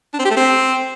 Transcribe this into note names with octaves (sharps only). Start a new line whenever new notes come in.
D4
C4
G4
A3
C4